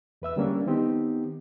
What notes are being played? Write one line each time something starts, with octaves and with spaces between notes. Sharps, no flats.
E2 B4 E5 E6
D3 G3 A#3 C#4 D4
D#3 B3 C4 D#4 G4